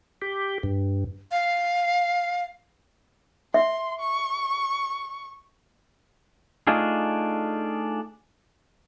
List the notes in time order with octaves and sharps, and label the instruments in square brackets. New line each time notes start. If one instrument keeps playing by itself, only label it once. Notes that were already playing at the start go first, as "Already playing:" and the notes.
[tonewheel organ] G4
G2
[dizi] F5
[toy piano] E5 [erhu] C6
[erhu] C#6
[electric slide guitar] A3 D4 D#4 F4 G#4